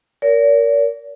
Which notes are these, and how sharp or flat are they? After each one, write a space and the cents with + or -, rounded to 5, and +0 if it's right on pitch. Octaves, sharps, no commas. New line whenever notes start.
A#4 +0 D5 -45